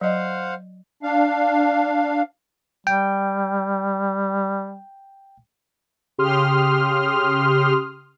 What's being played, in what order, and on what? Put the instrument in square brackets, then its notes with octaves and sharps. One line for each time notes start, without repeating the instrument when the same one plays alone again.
[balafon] F#3 D#5 [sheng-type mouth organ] C5 F5 F#5
[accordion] D4 F5
[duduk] G3 [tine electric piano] G5
[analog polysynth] C#3 G4 C6 D#6 F6